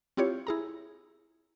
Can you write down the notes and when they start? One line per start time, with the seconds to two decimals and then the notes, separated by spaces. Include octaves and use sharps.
0.17 C4 E4 F4 G4 C#5
0.47 E4 G#4 A#5